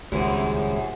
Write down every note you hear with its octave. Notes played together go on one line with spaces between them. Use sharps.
D#1 C#2 F#2 E4 G4 G#4 C5